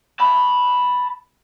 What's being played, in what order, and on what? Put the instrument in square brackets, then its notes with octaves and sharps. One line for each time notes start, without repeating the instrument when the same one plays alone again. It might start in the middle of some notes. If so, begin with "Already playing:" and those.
[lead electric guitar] A5 B5